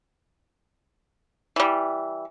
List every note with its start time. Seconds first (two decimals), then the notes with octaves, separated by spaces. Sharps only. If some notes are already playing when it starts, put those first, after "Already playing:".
1.56 E3 G3